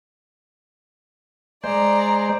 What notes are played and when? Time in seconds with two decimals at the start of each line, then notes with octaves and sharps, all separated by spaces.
1.64 G#3 C5 D5 A#5